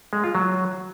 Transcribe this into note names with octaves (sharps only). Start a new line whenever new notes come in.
G#3
F4
F#3